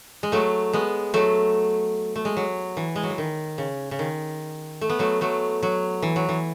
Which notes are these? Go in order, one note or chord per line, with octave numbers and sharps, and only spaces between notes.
G#3
F#3 A3
G#3 B3
F#3 A3
A3
G#3
F#3
E3
G#3
F#3
E3
D#3
C#3
C#3
D#3
A3
B3
F#3 A3
F#3 A3
F#3
E3
F#3
E3